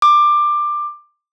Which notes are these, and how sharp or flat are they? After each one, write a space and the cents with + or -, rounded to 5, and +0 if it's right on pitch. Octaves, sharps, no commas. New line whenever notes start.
D6 +15